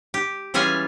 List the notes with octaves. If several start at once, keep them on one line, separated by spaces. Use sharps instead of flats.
G4
E3 G3 C#4 F4 G#4 G#5